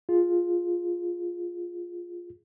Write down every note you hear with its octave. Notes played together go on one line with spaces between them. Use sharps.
F4 G#4